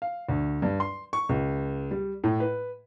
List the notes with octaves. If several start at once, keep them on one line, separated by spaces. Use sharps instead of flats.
F5
D2
G2
C6
C#6
C#2
G3
A2
B4